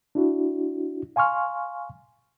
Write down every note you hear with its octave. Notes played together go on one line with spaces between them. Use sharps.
D4 E4 F#4
F5 G#5 C6 C#6 F6